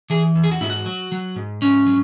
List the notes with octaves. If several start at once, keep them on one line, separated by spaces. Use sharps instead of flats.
E3 G#4
E2
G#4
F#4
G#2 E4
F#4
F#3
F#3
G#2
G#2 C#4
F#3